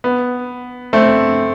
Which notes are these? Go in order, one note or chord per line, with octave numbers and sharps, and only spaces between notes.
B3
A3 C4